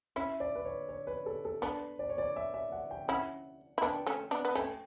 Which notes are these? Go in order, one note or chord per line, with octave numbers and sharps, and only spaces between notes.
C#4 E4 E5
D5
B4
C#5
C#5
B4
A4
A4
B3 D4 B4
D5
C#5
D5
E5
E5
F#5
G5
C#4 E4 F#5
E4
B3 D4 G5
A3 C#4
B3 D4
B3
A3 C#4 G5